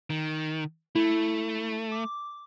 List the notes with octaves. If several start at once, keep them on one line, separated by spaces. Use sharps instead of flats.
D#3
A3 E4
D6